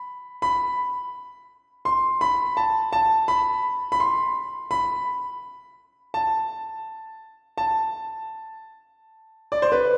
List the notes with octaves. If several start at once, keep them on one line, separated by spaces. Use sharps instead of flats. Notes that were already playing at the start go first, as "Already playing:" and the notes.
Already playing: B5
B5
C6
B5
A5
A5
B5
B5
C6
B5
A5
A5
D5
C5
B4